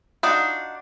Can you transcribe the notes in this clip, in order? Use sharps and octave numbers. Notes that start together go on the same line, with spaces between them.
D4 D#4 F4 F#4